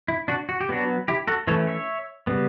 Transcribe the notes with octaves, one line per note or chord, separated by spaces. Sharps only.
E4
D4 F#4
F#4
G4
F#3 B3 D4 F#4
E4 G4
F#4 A4
E3 A3 C#4 A4 C#5
C#5 E5
C#3 G3 B3